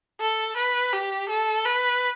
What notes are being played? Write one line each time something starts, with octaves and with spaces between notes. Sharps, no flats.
A4
B4
G4
A4
B4